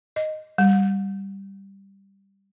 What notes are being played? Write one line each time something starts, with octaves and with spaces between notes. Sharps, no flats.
D#5
G3